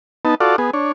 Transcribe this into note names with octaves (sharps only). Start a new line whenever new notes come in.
B3 D#4 A5
F4 F#4 A4 D5
B3 G#4
D4 C#5